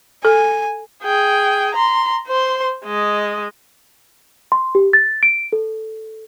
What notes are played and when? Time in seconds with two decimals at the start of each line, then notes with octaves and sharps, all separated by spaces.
0.25 A4 G#5
1.03 G#4 G5
1.75 A#5 C6
2.27 C5 C6
2.85 G#3 D#5
4.52 C6
4.75 G4
4.93 A6
5.23 D7
5.53 A4